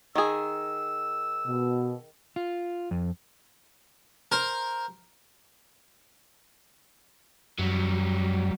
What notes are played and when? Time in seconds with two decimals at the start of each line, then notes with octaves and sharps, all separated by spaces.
0.15 D#3 G#4 E6
1.47 B2
2.36 F4
2.91 F2
4.32 A#4 C5
7.59 F#2 F#3 G3